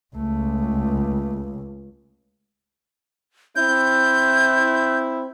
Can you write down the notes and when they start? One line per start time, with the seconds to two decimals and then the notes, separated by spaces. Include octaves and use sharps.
0.17 C#2 A3
3.56 C4 E4 G6